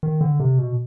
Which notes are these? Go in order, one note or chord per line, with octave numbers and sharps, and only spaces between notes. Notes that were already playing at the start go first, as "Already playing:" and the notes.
D#3
D3
C3
B2